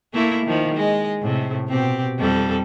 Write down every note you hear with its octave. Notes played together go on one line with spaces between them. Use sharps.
A3 A#3 E4
D#3 F3
G#3 D#5
A2 C3
B2 C4 G4
F2 G3 A4